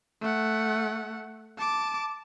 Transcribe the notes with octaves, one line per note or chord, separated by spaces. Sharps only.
A3 F#5
A5 D6